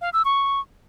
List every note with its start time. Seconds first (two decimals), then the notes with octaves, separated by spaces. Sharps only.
0.01 F5
0.13 E6
0.25 C#6